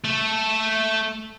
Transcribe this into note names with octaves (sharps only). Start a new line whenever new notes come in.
A3 A4